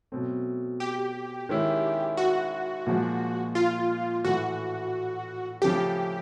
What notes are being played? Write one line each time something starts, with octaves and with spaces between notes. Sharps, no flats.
B2 F#3 A3 C4
G4
D#3 G#3 C#4 E4
F#4
A#2 F3 G#3
F4
A2 E3 A3 F#4
C#3 F3 A3 G4